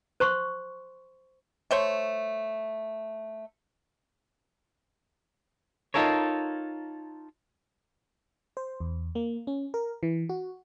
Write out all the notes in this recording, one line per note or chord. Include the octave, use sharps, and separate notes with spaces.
C5 C6 C#6
A3 C5 C#5
D#4 F4 A4 A#4 C#5
C5
E2
A#3
C#4
A#4
E3
F#4